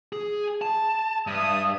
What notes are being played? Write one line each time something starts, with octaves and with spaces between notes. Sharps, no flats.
G#4
A5
G2 E5 D#6